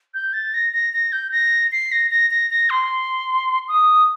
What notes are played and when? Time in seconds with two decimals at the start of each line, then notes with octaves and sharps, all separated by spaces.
0.14 G6
0.33 A6
0.54 A#6
0.73 A#6
0.94 A#6
1.12 G6
1.32 A#6
1.72 C7
1.92 A#6
2.11 A#6
2.31 A#6
2.51 A#6
2.70 C6
3.68 D#6